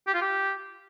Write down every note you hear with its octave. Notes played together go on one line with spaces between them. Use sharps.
G4
F4
G4